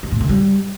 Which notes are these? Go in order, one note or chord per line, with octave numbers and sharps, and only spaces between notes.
D#3
A2
D3
G3